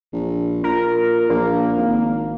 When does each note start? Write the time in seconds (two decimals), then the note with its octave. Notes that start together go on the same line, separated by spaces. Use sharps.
0.12 A#1
0.64 A#2 A#4
1.30 A#1 A#3
1.77 G#1